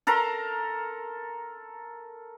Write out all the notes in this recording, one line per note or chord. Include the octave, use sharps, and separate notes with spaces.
A4 A#4 A#5 C6